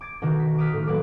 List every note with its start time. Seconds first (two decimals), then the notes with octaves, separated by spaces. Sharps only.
0.01 D6 G#6 A6 D7
0.22 B2 D#3 D#4 F#4 D6
0.39 B6
0.58 D6 D#6 F6 F#6 B6 C7
0.73 A2 D#3
0.87 F#3 A#3 B4 D6 C7